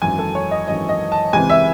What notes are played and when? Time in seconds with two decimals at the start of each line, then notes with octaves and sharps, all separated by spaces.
0.02 G#1 F#2 E3 G#5
0.19 A4
0.35 C#5
0.51 D#5
0.67 G#1 F#2 E3 D#5
0.89 D#5
1.12 A5
1.33 C#2 C3 E3 C4 G#5
1.50 E5